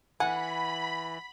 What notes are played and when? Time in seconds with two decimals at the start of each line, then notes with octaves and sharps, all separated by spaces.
0.20 E3 F#5 G#5 B5